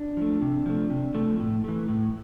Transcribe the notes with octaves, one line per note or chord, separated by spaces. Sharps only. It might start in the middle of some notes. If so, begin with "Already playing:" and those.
Already playing: D4
F3 A3
C3
F3 A3
C3
F3 A3
A2
E3 A3
A2